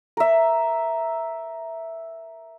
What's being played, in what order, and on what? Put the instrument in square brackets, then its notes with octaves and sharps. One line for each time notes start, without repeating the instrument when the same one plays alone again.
[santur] A#4 E5